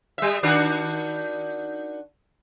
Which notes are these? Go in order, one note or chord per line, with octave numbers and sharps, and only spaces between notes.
G3 E5
D#3 D4 F#4